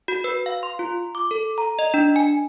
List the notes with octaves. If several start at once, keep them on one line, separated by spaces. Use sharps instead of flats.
F#4
B4
F5
C6
F4
D6
A4
A#5
D#5
D4
G#5